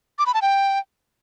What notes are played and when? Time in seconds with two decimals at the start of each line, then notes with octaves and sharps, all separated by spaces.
0.19 D6
0.26 B5
0.34 A5
0.42 G5